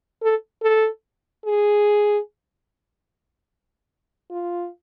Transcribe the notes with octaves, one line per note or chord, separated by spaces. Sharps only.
A4
A4
G#4
F4